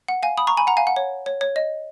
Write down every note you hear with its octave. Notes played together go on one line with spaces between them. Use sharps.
F#5
F5 G#5
B5 D#6
A#5 C#6
G#5 B5
F#5 A#5
F5 G#5
F#5
C#5
C#5
C#5
D#5